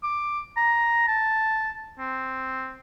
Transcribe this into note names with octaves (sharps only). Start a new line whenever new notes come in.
D6
A#5
A5
C4